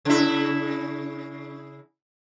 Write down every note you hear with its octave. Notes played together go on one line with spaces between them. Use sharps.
C#3 E4